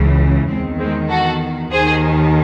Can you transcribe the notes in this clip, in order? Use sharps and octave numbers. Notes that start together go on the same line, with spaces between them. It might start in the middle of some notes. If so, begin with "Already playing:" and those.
Already playing: C#2 C#3 E3
E2 D#3 G#3 C4
G#3 C4
F#4 A4
D#2 D#3 G#4 C5